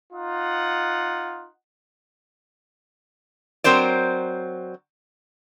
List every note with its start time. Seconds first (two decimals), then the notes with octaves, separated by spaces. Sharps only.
0.13 D#4 F4 F#5
3.64 F#3 C4 A#4 C5 D5